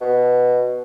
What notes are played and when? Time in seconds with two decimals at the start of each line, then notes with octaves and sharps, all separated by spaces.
0.01 B2